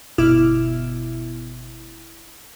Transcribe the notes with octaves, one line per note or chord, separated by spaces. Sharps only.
G1 B2 E4 D6 F6 E7